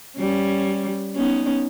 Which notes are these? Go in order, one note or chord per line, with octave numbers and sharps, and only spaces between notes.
G3 C#4
B3 C#4 D#4